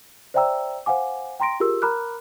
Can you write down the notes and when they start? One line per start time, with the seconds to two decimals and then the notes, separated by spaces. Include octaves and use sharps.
0.34 C5 D5 E5 G5 A#5 E6
0.86 C5 F5 F#5 G#5 D6
1.40 G5 A#5 C6 A#6 D7
1.60 F4 G4 G#4 A#4 E6
1.82 A#4 A#5 B5 D6 F6 F#6